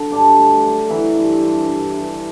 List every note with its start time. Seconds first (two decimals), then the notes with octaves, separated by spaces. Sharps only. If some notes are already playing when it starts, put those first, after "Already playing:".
Already playing: D3 F#3
0.12 G2 D4
0.38 A3
0.64 F#3
0.89 E3 F#3 E4
1.15 G2
1.41 G2
1.67 G2
1.93 G2